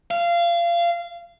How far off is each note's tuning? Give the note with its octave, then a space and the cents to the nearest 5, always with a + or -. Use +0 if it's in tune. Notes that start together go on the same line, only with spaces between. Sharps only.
F5 -25